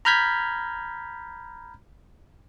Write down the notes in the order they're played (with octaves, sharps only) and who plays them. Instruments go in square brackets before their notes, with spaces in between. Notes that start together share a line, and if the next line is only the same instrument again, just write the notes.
[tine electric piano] A#5 B5 F6 G6 G#6 B6